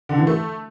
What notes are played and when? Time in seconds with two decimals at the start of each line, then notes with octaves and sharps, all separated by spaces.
0.09 D3
0.18 E3
0.27 A3